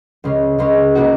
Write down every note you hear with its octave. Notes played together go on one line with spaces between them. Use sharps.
C#2 C#3 G#3 C#4
C#2 C#3 G#3 C#4
C#3 A#3 D#4 F#4